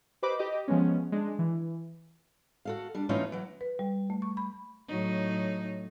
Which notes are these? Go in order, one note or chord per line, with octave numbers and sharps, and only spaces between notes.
G4 B4 C5 D#5 B5 D6
G4 D#5
F3 G#3 B3 C#4
G#3 D4
E3
F#4 A4 F5
G3 D4
E3 A3 C#4 D#4 F4 C#5
E3 F#3
B4
G3
A3
C#6
B5
A2 F#3 D#4